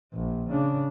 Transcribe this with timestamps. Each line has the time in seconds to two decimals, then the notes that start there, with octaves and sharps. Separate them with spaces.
0.14 A#1
0.50 C#3 D4